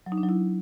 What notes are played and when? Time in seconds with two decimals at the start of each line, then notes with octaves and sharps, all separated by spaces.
0.06 F#3
0.12 D#4
0.18 D4
0.23 F#3
0.29 E4